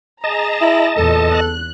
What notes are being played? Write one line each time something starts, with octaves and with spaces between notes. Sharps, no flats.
G#4 D#5 A5 A#5
E4
E2 A#2 A4
F#6